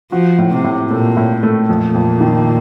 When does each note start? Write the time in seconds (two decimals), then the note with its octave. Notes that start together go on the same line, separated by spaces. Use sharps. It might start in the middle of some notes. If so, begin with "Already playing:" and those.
0.12 F3 F#4
0.38 A2
0.51 C3
0.64 A2
0.90 A#2 A3
1.17 A2
1.43 A3
1.68 F2 A#2
1.95 F2
2.21 D#3